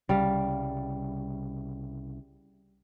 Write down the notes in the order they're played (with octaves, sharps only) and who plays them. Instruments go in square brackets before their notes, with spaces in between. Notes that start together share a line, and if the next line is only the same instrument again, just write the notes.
[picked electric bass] C2 C#3 [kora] G3 F5